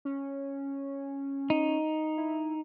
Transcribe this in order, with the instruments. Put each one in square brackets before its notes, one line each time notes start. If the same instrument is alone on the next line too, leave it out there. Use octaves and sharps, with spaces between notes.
[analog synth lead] C#4
[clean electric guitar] D#4
[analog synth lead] E4